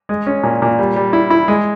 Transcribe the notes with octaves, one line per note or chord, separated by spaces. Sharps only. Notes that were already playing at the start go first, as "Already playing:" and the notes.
G#3
C#4
A#2
A#2
G3
G3
E4
E4
G#3